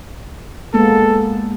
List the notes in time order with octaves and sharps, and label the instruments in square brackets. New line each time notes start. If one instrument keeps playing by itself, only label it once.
[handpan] G#3 A#3 B3 [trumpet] A4